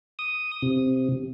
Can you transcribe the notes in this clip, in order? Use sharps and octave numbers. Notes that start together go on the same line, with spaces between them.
D#6
C3